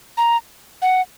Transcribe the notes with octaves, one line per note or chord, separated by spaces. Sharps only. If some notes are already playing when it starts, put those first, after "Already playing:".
A#5
F#5